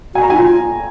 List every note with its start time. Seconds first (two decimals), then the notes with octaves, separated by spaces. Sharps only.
0.15 F#4 G#5
0.22 A#5
0.30 D#4 G#5
0.37 F4